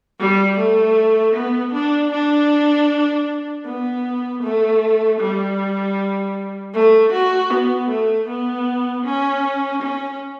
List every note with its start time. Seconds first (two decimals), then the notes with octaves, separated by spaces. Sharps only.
0.20 G3
0.58 A3
1.35 B3
1.73 D4
2.12 D4
3.66 B3
4.43 A3
5.20 G3
6.74 A3
7.13 F#4
7.51 B3
7.89 A3
8.28 B3
9.05 C#4
9.82 C#4